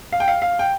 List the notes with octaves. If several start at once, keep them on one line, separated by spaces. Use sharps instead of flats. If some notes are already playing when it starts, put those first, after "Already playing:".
F5
G5
F5
F5
G5